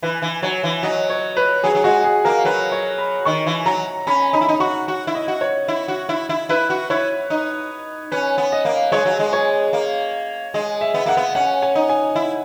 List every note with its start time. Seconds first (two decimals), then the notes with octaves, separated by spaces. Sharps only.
0.02 E3 B4
0.22 E3
0.42 F#3 C#5
0.64 E3
0.83 F#3 D#5
1.10 C#5
1.37 B4
1.63 F#3 G#4
1.75 F#3
1.84 G#3 F#4
2.04 G#4
2.25 A#3 A#4
2.45 F#3 B4
2.72 C#5
2.98 B5
3.25 D#3 C#6
3.46 E3
3.66 F#3 A#5
4.07 C#4 B5
4.33 D#4 B5
4.41 E4
4.49 D#4
4.60 F#4 C#6
4.88 F#4
5.07 E4
5.15 D#5
5.28 F#4
5.41 C#5
5.68 E4
5.88 F#4
6.09 E4
6.29 E4
6.49 E4 B4
6.70 F#4
6.90 E4 C#5
7.30 D#4
8.12 C#4 B4
8.38 B3
8.52 D#5
8.65 A#3
8.92 G#3 C#5
9.05 F#3
9.19 G#3
9.33 C#5
9.73 A#3
10.54 G#3 D#5
10.81 E5
10.94 B3
11.06 A#3 F#5
11.17 B3
11.35 C#4 F#5
11.62 G#5
11.75 D#4
11.89 G#5
12.16 E4